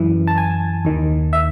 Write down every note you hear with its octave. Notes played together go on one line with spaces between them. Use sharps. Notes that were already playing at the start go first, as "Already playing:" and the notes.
Already playing: F#2 E3
A5
G#5
D#2 D#3
E5